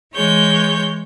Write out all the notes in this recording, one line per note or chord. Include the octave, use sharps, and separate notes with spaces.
E3 G#3 C#5 G6